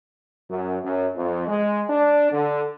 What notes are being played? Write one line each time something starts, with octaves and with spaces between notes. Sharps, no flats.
F#2
F#2
F2
G#3
D4
D3